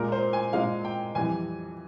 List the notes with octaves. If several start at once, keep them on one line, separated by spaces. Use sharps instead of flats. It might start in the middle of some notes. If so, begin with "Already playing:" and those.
Already playing: A#2 G#3 A#4
C5
G#5
A#2 G#3 F5
G5
F2 E3 G3 G#5